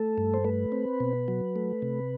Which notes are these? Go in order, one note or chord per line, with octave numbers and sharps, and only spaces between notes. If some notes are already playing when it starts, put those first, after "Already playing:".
Already playing: A3 A4
G2
C5
A3 B4
C4
B2
F#3
A3
C3